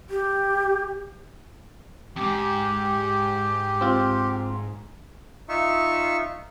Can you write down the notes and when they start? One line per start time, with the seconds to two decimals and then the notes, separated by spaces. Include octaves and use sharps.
0.10 G4
2.16 F2 G#2 G4
3.81 C4 F4
5.49 D#4 F4 E5 C#6